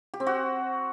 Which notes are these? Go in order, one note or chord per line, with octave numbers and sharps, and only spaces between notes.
G4
C4
F#4